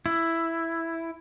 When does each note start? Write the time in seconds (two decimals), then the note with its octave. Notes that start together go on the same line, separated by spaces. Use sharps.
0.06 E4